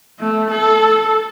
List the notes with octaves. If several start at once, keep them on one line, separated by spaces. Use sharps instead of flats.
A3
A4